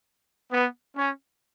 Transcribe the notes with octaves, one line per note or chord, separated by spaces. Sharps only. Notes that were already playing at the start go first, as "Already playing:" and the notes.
B3
C#4